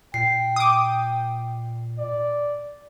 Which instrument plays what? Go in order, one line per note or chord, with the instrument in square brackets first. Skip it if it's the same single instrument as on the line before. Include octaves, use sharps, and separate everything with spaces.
[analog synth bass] A#2 [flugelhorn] G5 [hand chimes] C7
[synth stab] D6 D#6
[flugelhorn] D5